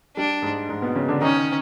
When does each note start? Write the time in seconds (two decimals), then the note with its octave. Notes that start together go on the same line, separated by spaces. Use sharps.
0.17 G3 D4
0.42 G#2 G#3
0.69 G#2 G#3
0.82 B2 B3
0.96 C#3 C#4
1.08 D3 D4
1.21 D#3 C#4 D#4